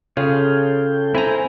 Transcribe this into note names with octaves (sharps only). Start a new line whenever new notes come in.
C#3 F4 G#4 A4 C#5 F5 G5
C4 E4 G#5 A#5 B5